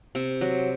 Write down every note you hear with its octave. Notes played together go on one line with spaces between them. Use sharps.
C3
F#3